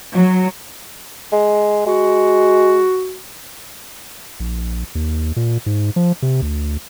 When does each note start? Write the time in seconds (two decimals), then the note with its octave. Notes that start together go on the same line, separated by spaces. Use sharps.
0.13 F#3
1.32 G#3
1.86 G#3 F#4
4.40 A#1
4.95 D#2
5.36 A#2
5.66 G#2
5.96 F3
6.22 C3
6.42 D2